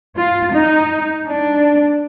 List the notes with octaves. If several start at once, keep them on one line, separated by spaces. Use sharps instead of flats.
F4
D#4
D4